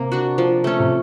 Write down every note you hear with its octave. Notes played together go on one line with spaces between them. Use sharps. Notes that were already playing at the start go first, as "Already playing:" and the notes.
Already playing: C3 A#3
D4 F#4
F3
A3 C#4
C3